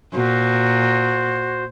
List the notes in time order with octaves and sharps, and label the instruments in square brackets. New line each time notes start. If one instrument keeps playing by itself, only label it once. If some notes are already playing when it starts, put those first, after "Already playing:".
[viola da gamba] A#2 [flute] F#4 [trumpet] C5